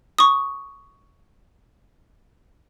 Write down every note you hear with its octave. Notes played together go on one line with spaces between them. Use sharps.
C#6 D#6